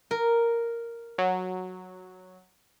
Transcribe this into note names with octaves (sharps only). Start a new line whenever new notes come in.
A#4
F#3